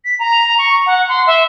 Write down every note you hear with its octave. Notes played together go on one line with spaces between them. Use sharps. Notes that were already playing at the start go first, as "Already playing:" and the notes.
B6
A#5
C#6
F#5
C6
E5